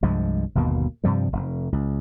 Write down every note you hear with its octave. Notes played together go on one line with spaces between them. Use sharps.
C2 G2 F3 G#3
G1 D#2 B2 A#3
G2 C3 F3 G3
F1
C#2